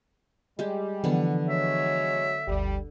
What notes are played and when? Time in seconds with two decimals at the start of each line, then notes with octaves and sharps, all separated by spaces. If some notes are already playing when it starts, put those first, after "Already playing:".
0.59 G3 G#3 G4
1.04 D3 E3 F3 B3
1.48 F#3 G#3 C#5 E5
2.48 G1 D2 G3